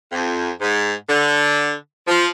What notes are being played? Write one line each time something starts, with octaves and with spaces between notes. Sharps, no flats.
F2
G#2
D3
F3